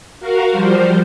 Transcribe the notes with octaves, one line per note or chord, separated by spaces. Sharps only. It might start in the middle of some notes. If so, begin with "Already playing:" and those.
F#4 A#4 F5
F3 G3 C5